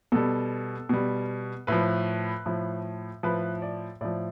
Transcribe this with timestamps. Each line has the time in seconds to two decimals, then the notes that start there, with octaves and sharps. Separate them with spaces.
0.12 B2 G3 A4
0.89 B2 G3
1.67 A2 F3 B4
2.46 A2 F3
3.23 A2 F3 B4
3.62 D5
4.01 A2 F3 D5